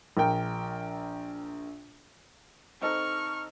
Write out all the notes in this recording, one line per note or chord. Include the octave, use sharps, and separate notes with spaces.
A#1 A#4 G5
C4 D#4 A4 C#6 F6